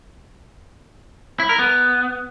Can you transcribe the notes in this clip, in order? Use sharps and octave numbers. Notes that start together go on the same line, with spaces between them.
E4
A#4
B3